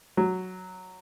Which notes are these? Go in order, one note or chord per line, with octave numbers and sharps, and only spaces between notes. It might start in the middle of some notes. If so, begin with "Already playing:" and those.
F#3